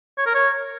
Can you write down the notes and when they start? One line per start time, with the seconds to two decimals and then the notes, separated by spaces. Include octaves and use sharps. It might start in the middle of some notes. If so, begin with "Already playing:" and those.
0.18 C#5
0.26 A#4
0.34 C#5